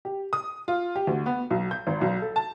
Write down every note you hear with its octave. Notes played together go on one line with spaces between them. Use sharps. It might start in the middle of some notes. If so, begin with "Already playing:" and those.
G4
D#6
F4
G4
D2
B3
B1
G6
G#1
B1
A4
A5